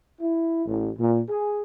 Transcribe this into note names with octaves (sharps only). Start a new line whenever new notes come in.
E4
A1
A#2
G#4